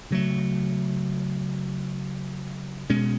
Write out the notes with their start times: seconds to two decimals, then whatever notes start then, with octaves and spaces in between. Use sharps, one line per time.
0.11 C#3 F#3 A3
2.90 B2 G#3 C#4